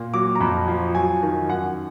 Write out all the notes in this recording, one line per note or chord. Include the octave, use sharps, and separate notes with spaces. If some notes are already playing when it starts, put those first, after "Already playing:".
Already playing: A#2
F#3 D6
A#5
F2 B5
F3
F#3 G#5
D#3
F#2 F#5